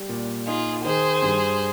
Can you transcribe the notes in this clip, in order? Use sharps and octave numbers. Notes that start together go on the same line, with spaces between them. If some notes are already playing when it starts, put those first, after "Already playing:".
Already playing: G3
A#2
D#4 F4 G#4
D#3 G#4 C5
G2